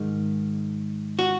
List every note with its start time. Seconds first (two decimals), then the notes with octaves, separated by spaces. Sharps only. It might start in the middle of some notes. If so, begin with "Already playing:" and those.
Already playing: G#2 D#3
1.19 F#4